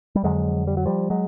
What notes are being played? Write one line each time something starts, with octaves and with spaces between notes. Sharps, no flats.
G3
F2 D3 F#3 G#3
G3
F#3
F3 G3
F#3 G#3